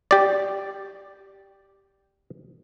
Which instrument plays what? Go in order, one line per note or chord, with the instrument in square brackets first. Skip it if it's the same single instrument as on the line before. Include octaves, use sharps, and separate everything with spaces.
[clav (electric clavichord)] G4 D5